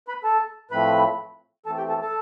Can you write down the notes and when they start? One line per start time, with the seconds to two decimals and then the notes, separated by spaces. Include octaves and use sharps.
0.08 B4 B5
0.24 A4 A5
0.71 A2 F3 A3 C4 B4 B5
1.66 E3 A4 A5
1.69 A3 C4
1.77 G4 G5
1.89 A4 A5
2.01 A4 A5